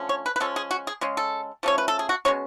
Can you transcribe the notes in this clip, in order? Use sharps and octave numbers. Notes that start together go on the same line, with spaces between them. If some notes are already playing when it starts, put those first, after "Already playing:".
Already playing: D3 F3 A3 C#4
C#5
B4
B4
F3 G#3 C#4 A4
G#4
F#4
G#4
C#3 G#3 C#4
A4
F3 A3 C#4 C#5
B4
A4
G#4
F#4
B2 G#3 C#4 C#5